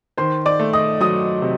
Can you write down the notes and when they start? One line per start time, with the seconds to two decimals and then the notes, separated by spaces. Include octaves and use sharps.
0.18 D#3 C5 C6
0.46 D5 D6
0.59 A3
0.73 D#5 D#6
1.00 F#3 D#5 D#6
1.42 C3